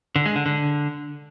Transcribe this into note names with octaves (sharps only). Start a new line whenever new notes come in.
D3
G#3
D3
D3